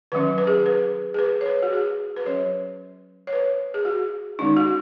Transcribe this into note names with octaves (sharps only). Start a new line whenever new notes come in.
D#3 F#3 C#4 B4
B4
G#4
B4
G#4
B4
C#5
B4
F#4
G#4
B4
F#3 C#4 C#5
C#5
B4
G#4
F#4
D#3 G#3 C#4 D#4
F#4